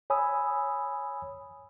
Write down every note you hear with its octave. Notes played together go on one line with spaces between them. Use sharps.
C#5 G#5 B5 D#6 E6